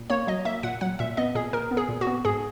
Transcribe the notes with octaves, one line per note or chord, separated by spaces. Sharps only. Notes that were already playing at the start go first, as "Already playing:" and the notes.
Already playing: A#2
A#3 C#5
F#3 D#5
A#3 E5
A#2 F#5
F#3 F#5
A#2 E5
B3 D#5
A#2 G#4
A#2 A#4
B3
G#4
A#2
F#4
B3
G#2 G#4